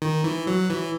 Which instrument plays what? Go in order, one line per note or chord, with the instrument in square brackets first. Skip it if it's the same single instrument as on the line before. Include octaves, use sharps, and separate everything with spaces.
[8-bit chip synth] D#3
E3
F#3
E3